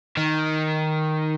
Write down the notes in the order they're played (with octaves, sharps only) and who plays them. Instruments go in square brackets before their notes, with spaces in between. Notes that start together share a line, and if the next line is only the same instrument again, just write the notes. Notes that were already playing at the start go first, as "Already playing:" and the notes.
[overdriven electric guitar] D#3